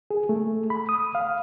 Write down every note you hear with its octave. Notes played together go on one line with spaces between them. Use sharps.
G#4
A3
B5
D#6
F5